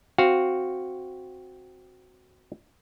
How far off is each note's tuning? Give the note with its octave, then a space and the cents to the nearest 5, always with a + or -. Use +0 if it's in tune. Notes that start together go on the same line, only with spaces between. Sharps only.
C4 +0 F#4 +0 F5 +0